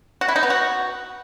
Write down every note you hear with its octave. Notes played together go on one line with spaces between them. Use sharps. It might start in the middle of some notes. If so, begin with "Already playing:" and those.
F#4
E4
D#4
B3
F#4